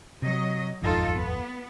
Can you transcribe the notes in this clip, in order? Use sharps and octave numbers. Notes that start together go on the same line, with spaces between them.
C3 F#3 D#5
D#1 G#1 F2 D#4 F4 A4
B3